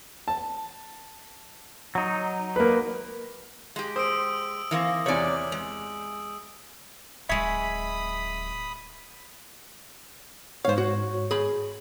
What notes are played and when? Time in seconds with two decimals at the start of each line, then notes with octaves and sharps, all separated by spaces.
0.28 A5
1.95 F#3 D#4
2.56 A#3 B4
3.76 G#3 G4
3.96 C5 D#6 E6 D7
4.71 E3 A#3 C4
5.06 E2 C3 C#5 D5 F#7
5.52 G#3
7.29 D1 G#3 C#5 E5 B5 D#6
10.65 G#2 C5 C#5 F5
10.78 F#4
11.31 G#4 B5